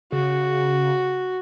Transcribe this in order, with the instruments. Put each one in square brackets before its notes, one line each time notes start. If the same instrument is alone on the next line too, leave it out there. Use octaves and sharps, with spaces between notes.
[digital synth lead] C#3 [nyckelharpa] F#4